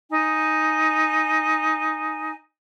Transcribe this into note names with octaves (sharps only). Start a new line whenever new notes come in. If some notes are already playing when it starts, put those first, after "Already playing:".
D#4 G#5